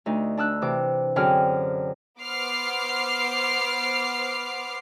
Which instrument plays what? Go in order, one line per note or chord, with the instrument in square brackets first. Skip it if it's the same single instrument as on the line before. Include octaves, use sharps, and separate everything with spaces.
[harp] D2 D#4
D4 A5 E6 F#6
C3 E3 D6
F#2 D3 C4 G#4 G5 F6
[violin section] B3 C5 D6 F6 C7